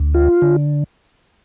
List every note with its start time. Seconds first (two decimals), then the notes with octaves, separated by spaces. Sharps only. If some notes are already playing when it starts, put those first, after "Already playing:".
Already playing: D2
0.14 F4
0.42 D3